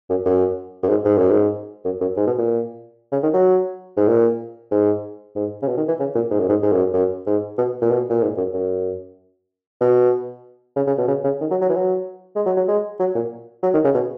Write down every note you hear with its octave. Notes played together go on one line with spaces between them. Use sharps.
F#2
F#2
F#2
G#2
G#2
F#2
G#2
F#2
F#2
G#2
B2
A#2
C#3
D#3
F#3
G#2
A#2
G#2
G#2
C#3
B2
D#3
E3
C#3
A#2
G#2
F#2
G#2
G#2
F#2
F#2
G#2
B2
A#2
B2
A#2
G#2
F#2
F#2
B2
C#3
C#3
B2
C#3
C#3
D#3
F#3
F#3
E3
F#3
G#3
F#3
F#3
G#3
F#3
A#2
F#3
D#3
C#3
B2